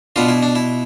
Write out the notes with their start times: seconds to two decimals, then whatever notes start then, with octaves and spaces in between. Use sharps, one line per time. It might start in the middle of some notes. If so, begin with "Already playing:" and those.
0.16 B2 B3 D4 F4
0.28 E4
0.43 D4
0.55 E4